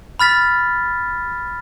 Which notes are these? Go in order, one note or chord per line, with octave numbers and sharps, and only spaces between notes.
B5 F6 A6 B6